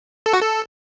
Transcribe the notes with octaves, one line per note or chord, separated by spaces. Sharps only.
A4
F#4
A4